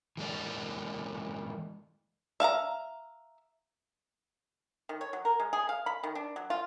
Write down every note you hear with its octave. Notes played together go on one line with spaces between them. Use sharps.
E3 G#3 A#3 D5
E5 F5 A5 A#5
D#3
C#5
F#3
A#4
G#3
G#4
F5
B5
D#3
D4
F#3
F4